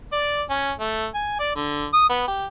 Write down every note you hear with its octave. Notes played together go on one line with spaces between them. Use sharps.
D5
C#4
A3
G#5
D5
D3
D#6
B3
G4